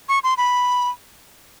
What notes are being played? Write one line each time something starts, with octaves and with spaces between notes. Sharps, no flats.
C#6
C6
B5